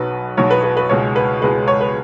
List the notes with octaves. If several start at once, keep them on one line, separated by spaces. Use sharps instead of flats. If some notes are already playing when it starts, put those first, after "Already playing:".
Already playing: B1 B2 F#3 B4
B1 B2 F#3 C#5
B4
B4
B4
C#2 B2 G#3 C#5
B4
C#2 B2 G#3 B4
C#5
B4